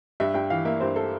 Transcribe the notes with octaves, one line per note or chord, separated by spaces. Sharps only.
G2 E5
G2 G5
E3 F5
A#3 E5
G2 C5
A4